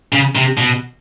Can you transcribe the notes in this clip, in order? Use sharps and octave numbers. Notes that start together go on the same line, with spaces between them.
C#3
C3
B2